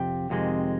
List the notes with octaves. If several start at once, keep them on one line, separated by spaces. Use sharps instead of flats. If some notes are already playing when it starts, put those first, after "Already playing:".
Already playing: F2 C3 G5
F2 C3 D#3 G#3